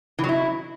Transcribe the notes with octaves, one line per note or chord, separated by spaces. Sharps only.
E3
F#3
E4